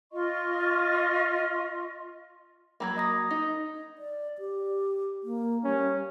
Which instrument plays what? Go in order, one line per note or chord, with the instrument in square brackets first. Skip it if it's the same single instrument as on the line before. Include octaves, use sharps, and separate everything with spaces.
[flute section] F4 D#5 C6 C#6
[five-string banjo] F#3 A#3 [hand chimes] B5 G#6
[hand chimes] D#5 D#6 A#6
[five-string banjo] D#4
[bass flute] D5
G4
A#3
[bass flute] G3 [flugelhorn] C#4